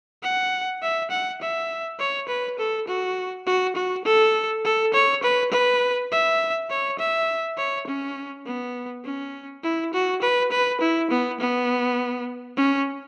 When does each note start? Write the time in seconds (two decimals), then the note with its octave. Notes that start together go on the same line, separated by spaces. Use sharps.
0.23 F#5
0.82 E5
1.11 F#5
1.41 E5
1.99 C#5
2.28 B4
2.59 A4
2.88 F#4
3.46 F#4
3.76 F#4
4.05 A4
4.65 A4
4.94 C#5
5.23 B4
5.52 B4
6.11 E5
6.70 C#5
6.99 E5
7.58 C#5
7.87 C#4
8.46 B3
9.04 C#4
9.64 E4
9.94 F#4
10.22 B4
10.51 B4
10.81 E4
11.11 B3
11.40 B3
12.57 C#4